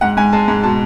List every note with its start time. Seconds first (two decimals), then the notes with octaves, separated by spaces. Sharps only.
0.01 G#2 F#5
0.17 G#2 G#5
0.33 G#3 A5
0.48 G#2
0.63 B2 A5